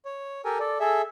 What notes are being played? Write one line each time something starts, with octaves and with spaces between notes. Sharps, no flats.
C#5
G4 A4 A#4 G#5
A4 D5
G#4 A4 E5